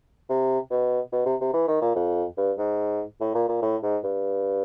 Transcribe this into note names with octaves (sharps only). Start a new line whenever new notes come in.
C3
B2
B2
C3
C3
E3
D#3
A#2
F2
G2
G#2
A2
A#2
A#2
A2
G#2
G2